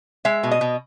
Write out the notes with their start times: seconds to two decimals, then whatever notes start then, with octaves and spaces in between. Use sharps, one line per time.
0.25 G#3 E5
0.43 B2
0.51 D#5
0.61 B2